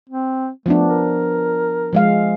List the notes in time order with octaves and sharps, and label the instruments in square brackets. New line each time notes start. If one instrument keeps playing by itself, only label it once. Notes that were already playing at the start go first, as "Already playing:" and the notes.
[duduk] C4
[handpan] F3 B3 D4 [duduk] A3
[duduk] A#4
[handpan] F3 G#3 F5